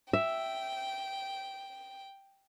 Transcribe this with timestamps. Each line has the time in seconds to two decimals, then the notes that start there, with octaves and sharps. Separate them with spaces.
0.13 E5 G5